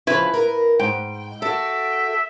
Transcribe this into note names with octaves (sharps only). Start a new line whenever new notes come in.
C#3 F3 E4 B4
A#4
G#2 G5
F#4 A4 E5